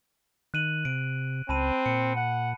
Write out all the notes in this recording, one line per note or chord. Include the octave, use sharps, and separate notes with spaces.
D#3 F#6 D#7 F#7
C3 D7
C#2 C4 A5 B5 D#7
A#2 C#7
F#5